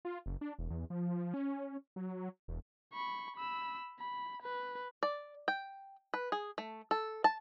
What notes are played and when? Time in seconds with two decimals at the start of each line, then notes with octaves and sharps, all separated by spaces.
0.05 F4
0.26 F#1
0.41 D4
0.59 E1
0.70 E2
0.90 F3
1.34 C#4
1.96 F#3
2.48 E1
2.93 B5 C#6
3.36 B5 E6
4.00 B5
4.42 B4
5.03 D5
5.48 G5
6.14 B4
6.32 G#4
6.58 A3
6.91 A4
7.24 A5